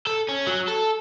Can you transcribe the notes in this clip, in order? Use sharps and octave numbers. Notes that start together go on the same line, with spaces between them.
A4
C#4
F#3
A4